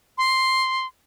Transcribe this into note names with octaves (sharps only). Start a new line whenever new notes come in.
C6